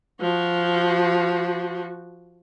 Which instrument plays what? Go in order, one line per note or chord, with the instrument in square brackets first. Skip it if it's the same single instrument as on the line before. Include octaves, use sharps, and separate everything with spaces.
[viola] F3 F#4